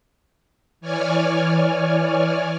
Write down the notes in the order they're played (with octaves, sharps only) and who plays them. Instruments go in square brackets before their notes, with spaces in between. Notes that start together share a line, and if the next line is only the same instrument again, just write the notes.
[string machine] E3 C#5 D5 G#5 F6